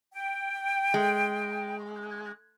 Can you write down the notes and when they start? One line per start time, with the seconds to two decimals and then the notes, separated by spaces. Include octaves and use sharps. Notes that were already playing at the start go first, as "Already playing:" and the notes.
0.13 G5
0.94 G#3